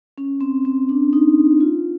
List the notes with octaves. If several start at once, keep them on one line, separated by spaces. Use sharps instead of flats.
C#4
C4
C4
D4
D#4
F4